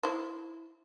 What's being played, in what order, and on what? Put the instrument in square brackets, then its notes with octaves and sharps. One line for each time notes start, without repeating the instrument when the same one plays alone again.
[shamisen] E4 C5